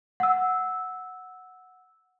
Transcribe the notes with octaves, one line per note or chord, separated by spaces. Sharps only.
F#5 E6